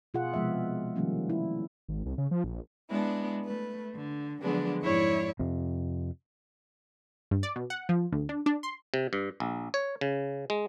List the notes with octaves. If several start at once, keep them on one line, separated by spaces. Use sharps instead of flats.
B2 F4 G#4 F#5
C3 F3 G#3 B3 E5
D#3 F3 G3 A#3 C#4
E4
G#1
C2
C#3
F3
A#1
G#3 B3 D4 E4
A3 B4
D3
D3 F3 F#3 G#3 B3 D4
F2 G#2 E4 C#5 D5 C#6
F2 C3
G2
D5
B2
F#5
F3
D2
D4
D4
C6
C3
G2
A#1
C#5
C#3
G#3